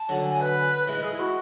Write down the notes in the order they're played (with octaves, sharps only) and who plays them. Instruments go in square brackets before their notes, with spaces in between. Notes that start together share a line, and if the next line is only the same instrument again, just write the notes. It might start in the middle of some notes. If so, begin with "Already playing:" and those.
Already playing: [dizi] A5
[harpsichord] D3 F#3
[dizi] G#5
B4
[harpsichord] E3 G#3 [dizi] B4
[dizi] G#4
E4
F#4